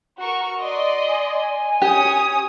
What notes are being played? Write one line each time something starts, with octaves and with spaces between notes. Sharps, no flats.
F#4 A#4 C#6
D5 D#5 C6
G#5
C#4 G4 C#5 D#6